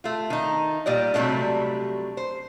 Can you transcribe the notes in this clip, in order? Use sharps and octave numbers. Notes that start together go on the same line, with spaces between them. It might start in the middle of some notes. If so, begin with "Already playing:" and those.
A3 F4
D#3 D#4
A#2 G3 D5 D#5
C3 F#3 G3 A3 A#3 D4
C5